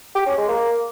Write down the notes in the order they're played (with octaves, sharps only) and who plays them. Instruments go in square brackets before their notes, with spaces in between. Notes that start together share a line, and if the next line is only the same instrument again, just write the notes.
[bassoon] G4
C#4
G#3
A#3